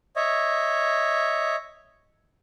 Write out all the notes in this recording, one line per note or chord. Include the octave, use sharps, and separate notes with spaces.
C#5 D#5 E5